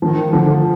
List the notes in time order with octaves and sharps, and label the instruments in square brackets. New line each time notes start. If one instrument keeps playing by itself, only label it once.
[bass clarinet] D#3 [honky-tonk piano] F3
[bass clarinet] D3 [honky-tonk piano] F3